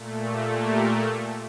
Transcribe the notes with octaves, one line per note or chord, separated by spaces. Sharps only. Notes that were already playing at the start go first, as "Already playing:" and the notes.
Already playing: A#2 A3
G4
G4 A#4